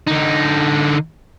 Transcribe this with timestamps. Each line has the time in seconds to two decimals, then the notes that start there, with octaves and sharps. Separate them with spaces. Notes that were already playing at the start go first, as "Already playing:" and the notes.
0.07 D3 D#4